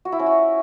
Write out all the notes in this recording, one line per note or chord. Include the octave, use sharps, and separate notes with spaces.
F#4
E4
C#4
F#4